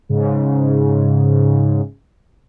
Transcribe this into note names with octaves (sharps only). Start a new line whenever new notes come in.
G#2 C#3